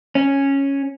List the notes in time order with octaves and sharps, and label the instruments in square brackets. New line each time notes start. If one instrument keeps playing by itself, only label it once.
[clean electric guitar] C#4